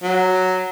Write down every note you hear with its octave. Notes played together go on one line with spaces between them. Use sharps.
F#3